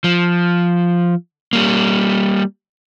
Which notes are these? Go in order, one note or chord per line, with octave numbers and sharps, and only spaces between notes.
F3
G3 A#3